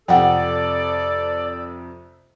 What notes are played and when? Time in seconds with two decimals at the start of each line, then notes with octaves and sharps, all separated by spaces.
0.08 F2 C3 A4 D5 F#5 G5